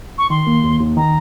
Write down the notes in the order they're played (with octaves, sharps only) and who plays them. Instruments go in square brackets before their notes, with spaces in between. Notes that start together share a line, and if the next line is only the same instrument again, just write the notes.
[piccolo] C#6
[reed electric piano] D#3 [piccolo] C6
[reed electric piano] A#3
D#2
D#2
[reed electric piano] D#3 [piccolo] A#5